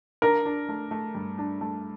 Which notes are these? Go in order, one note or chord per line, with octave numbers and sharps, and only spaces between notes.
D4 A#4
D4
A3
A3
G2
D4
A3